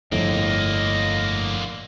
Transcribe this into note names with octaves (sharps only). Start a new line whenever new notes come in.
G1 F2 A2 D3 F3 A#3 D#5